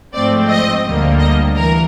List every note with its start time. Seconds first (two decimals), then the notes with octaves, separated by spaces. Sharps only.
0.14 G#2 F3 A3 C4 D5
0.49 D#5
0.85 D2 D3 G3 A#3
1.20 D#5
1.56 E3 A#4